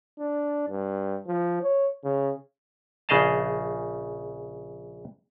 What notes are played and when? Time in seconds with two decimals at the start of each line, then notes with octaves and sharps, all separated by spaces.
0.19 D4
0.69 G2
1.27 F3
1.62 C#5
2.04 C#3
3.09 A#1 C#3 G#4 D#5 F5 A5